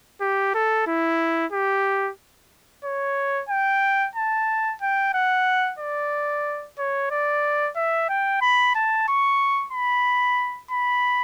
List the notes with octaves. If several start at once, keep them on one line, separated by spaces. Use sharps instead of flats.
G4
A4
E4
G4
C#5
G5
A5
G5
F#5
D5
C#5
D5
E5
G5
B5
A5
C#6
B5
B5